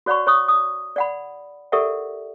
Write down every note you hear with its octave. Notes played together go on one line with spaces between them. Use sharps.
F#4 C#5 D5 F#5 B5 C#6
C#5 C#6 D#6
D#6
D5 F#5 B5
G4 A4 A#4 D5 E5 F#5